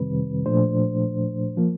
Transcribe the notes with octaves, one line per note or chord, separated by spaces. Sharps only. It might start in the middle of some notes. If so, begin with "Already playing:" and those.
Already playing: F2 C3 D#3 G3 C4 B4
A#2 F3 A3 D4 C5
F3 A#3